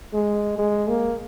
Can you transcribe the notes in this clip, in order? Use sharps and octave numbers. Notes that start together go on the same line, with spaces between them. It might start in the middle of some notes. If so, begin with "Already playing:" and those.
G#3
G#3
A#3